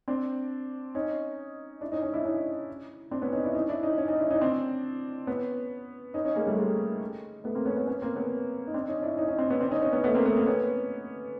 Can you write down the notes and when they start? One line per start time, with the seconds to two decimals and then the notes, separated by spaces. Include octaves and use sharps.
0.08 C4 D4
0.95 C#4 D#4
1.81 D4 E4
1.92 C#4 D#4
2.03 C#4 D#4
2.14 D4 E4
2.25 C#4 D#4
3.11 C4 D4
3.22 B3 C#4
3.33 C#4 D#4
3.44 D4 E4
3.54 C#4 D#4
3.68 D4 E4
3.83 C#4 D#4
3.98 C#4 D#4
4.08 C#4 D#4
4.19 D4 E4
4.30 C#4 D#4
4.41 C4 D4
5.27 B3 C#4
6.14 C#4 D#4
6.25 C#4 D#4
6.36 G#3 A#3
6.47 G3 A3
6.57 G#3 A#3
7.44 A3 B3
7.55 A#3 C4
7.65 B3 C#4
7.77 B3 C#4
7.88 B3 C#4
8.02 A#3 C4
8.16 B3 C#4
8.67 D#4
8.74 C4 D4
8.88 C#4 D#4
9.02 D4 E4
9.17 C#4 D#4
9.28 C#4 D#4
9.38 C4 D4
9.50 B3 C#4
9.60 C4 D4
9.71 C#4 D#4
9.82 C#4 D#4
9.93 B3 C#4
10.04 A3 B3
10.15 A#3 C4
10.26 A3 B3
10.37 A#3 C4
10.47 B3 C#4